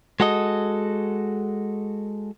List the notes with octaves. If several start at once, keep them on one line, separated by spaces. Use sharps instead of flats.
G#3 F#4 A4 D#5